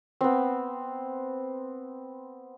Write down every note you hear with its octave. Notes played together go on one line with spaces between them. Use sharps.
B3 C4